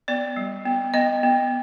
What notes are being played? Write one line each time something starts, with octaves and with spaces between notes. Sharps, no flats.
B3 D5
G3
B3
B3 D#5
B3